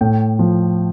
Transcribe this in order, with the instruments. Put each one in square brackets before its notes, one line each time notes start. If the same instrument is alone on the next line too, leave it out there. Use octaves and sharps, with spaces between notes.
[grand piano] A2 G5
F3